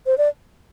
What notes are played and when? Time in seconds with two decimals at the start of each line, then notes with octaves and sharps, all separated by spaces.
0.06 C5
0.18 D5